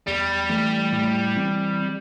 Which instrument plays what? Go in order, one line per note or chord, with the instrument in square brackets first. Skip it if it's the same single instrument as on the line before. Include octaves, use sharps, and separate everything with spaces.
[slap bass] E2 [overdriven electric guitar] G3
[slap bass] E3 A3
A2
E3 C4